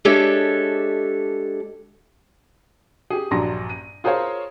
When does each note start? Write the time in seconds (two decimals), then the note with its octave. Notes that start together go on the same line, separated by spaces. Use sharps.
0.05 G#3 D4 G4 A4 C#5 E5
3.10 G4 G#4
3.31 A#1 G2 F#3 A#5 C6 A#6
3.69 D#7
4.04 F4 G#4 A#4 C5 C#5 F5